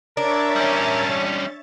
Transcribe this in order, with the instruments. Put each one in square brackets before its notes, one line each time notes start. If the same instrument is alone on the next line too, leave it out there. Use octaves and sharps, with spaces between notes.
[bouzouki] D4 [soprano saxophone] A#4 [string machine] C#5 E5 A6
[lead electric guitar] G3 C#4